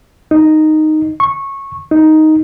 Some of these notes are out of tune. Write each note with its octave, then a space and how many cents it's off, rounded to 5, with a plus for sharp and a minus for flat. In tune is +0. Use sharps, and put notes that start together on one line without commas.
D#4 -5
C#6 -15
D#4 +5